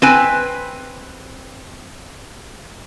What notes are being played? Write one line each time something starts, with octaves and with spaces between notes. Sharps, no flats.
C4 B4 G#5